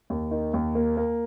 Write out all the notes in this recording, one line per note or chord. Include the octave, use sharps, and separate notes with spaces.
D#2
D#3
D#2
A#3
A#3